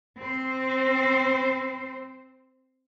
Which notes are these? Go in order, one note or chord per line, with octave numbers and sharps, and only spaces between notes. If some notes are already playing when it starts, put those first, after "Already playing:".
C4 C5